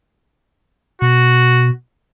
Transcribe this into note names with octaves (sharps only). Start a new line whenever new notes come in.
B2 F#4